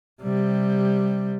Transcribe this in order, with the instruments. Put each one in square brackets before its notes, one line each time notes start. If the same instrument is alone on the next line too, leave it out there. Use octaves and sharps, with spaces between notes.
[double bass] C3 G3